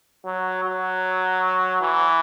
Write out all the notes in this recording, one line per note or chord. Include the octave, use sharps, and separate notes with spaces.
F#3
F#3
E3